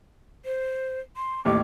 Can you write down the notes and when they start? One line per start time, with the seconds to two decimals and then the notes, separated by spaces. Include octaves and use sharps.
0.45 C5
1.17 C6
1.45 A1 D#2 D6